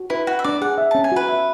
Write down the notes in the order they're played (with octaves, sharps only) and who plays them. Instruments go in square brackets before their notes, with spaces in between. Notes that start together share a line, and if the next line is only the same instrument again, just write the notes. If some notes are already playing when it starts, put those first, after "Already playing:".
Already playing: [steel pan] F#4
[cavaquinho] E4 [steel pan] B4
[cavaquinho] F#4 [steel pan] F#5
[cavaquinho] E5
[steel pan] D4 [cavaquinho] D5
[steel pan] G#4 [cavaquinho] F#5
[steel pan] E5
[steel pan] C#4 [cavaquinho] A5
[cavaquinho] G#5
[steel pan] F#4 [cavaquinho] B4
[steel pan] E5